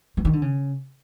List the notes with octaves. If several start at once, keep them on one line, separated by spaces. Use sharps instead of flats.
E3
D#3
D3
C#3